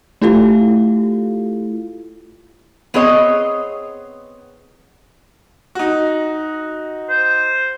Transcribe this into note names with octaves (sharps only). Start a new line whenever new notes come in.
A3 E4 F4 G4 A4 F5
B3 C4 G#4 C#5 D#5
D#4 F#4
C5